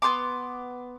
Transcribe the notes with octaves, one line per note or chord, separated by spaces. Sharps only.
B3 G4 C6 D6